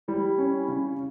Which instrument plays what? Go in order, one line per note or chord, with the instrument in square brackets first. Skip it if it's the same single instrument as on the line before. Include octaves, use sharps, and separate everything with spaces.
[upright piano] G3 [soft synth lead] E4
[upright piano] C#4
C#3